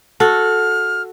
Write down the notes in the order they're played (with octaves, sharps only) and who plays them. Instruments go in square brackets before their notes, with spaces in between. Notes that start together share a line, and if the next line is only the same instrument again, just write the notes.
[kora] F#4 A4 [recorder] F6